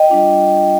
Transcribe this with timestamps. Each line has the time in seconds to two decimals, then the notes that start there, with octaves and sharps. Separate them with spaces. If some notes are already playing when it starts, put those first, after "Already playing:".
Already playing: D#5 G5
0.10 G3 D4 F4